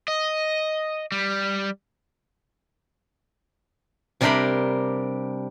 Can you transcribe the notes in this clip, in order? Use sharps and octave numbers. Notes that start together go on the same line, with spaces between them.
D#5
G3
C3 G3 D4 A#4 C5 B5